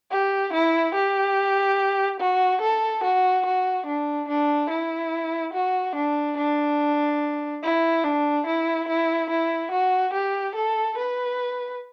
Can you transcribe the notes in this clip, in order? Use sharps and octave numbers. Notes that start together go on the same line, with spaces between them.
G4
E4
G4
F#4
A4
F#4
F#4
D4
D4
E4
F#4
D4
D4
E4
D4
E4
E4
E4
F#4
G4
A4
B4